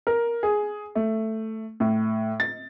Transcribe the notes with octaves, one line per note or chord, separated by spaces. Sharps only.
A#4
G#4
A3
A2
A6